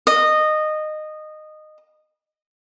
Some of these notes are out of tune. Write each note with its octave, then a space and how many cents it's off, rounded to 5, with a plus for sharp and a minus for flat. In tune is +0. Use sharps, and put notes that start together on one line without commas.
D#5 -15